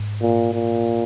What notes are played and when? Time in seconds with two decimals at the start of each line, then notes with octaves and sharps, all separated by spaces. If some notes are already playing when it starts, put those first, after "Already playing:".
Already playing: G#2
0.21 A#2
0.53 A#2